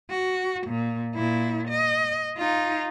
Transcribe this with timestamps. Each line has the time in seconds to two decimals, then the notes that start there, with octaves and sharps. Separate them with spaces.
0.11 F#4
0.68 A#2
1.15 A#2 E4
1.69 D#5
2.38 D#4 F4